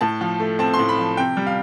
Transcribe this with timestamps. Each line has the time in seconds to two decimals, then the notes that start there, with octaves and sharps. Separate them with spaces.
0.01 A2 A5
0.21 F3
0.40 A3
0.59 C4 A5
0.74 C6
0.79 A2
0.89 B5
0.98 F3
1.17 C3 G5
1.37 G3
1.47 F5